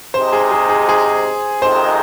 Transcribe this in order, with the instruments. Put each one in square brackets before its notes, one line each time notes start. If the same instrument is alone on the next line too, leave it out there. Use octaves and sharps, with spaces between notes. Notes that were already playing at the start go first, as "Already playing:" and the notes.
[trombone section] C3 G#3 D#4 [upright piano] C5
[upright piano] G#4
G#4
G#4
G#4
[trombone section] F2 C3 D#3 G#3 D#4 [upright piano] C5